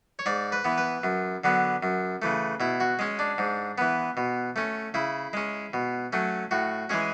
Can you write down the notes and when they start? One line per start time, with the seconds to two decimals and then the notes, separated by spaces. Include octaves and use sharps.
0.19 C#5
0.26 G#2 D5
0.52 B4
0.64 E3 B3
0.77 B4
1.04 F#2
1.44 D3 F#3 B3
1.83 F#2
2.22 C#3 E3 A3
2.60 B2 E4
2.80 F#4
2.99 G#3 C#4
3.19 D4
3.38 G#2
3.78 E3 B3
4.17 B2
4.56 A3 C#4
4.94 C#3 E4
5.33 G#3 C#4
5.73 B2
6.13 F#3 A3 C#4
6.51 A2 F#4
6.89 E3 G#3 C#4 G#4